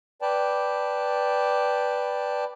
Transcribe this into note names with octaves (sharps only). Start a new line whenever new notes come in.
B4 D5 G5 A5